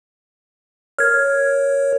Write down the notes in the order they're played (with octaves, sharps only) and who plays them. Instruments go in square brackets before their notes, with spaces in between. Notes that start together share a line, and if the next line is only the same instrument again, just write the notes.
[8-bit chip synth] A#4 C#5 [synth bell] F6 G#6